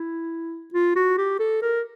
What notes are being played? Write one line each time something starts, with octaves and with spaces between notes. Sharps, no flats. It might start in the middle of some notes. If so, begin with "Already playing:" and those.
Already playing: E4
F4
F#4
G4
A4
A#4